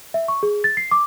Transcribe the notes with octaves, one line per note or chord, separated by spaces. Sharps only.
E5
C#6
G#4
A6
C7
D6